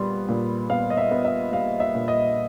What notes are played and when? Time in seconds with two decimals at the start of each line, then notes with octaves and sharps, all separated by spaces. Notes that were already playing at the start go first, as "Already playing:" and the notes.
Already playing: A#2 G3 B3 C6
0.29 A#2
0.70 B3 F5
0.90 D#5
0.97 E5
1.11 B3
1.25 E5
1.52 G3 F5
1.80 E5
1.95 A#2
2.08 D#5